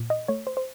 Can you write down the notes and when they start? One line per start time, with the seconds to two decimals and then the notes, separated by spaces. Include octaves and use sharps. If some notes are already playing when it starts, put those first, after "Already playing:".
Already playing: A#2
0.10 D#5
0.28 A3 C#5
0.47 C5
0.57 C5